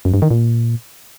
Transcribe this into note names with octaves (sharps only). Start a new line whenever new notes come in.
F#2
G2
D#3
A#2